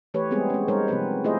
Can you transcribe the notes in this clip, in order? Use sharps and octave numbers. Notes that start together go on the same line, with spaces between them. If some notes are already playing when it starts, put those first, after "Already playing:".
E3 A3 G4 B4 C#5
G3 G#3 B3 C4 G#4
G#3 C#4
G3 G#3 D#4 A#4 C5 C#5
C3 F3 B3 C4 B4
A3 E4 F4 G#4 C5 D#5